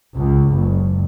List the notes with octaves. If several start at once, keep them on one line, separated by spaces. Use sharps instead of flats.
C#2
F#1